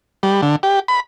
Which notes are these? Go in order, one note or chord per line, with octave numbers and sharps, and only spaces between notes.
G3
D3
G4
B5